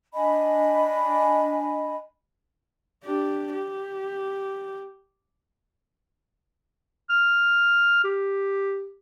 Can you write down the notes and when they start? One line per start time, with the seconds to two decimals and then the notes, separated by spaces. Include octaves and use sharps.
0.14 D4 D#5 G#5 B5
3.04 D4 G4
3.53 G4
7.10 F6
8.04 G4